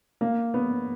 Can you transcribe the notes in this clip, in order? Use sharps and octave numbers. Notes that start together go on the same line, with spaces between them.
A#3
B3